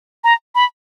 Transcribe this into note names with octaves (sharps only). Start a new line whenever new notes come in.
A#5
B5